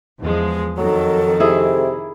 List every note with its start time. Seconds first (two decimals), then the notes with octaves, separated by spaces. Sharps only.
0.20 E2 F3 G#3
0.77 F2 D#3 F#3 A4
1.40 C3 E4 G#4